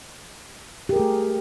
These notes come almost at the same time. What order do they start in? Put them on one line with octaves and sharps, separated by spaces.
G4 A#4 G#4 A3